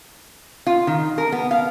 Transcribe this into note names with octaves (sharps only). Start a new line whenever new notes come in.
F4
D#3
A#4
B3
F5